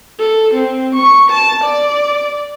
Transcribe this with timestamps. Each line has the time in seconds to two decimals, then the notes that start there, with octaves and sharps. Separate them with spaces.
0.19 A4
0.54 C4
0.95 C#6
1.31 A5
1.64 D5